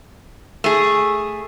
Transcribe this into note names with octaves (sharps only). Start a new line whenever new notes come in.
A3 G#4